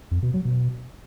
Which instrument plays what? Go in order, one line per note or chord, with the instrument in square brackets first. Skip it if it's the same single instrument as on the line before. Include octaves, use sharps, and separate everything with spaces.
[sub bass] F2
B2
F#3
B2